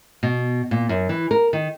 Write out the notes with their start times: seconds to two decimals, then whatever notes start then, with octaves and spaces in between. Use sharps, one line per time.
0.23 B2
0.71 A#2
0.89 F#2
1.09 E3
1.31 A#4
1.53 D#3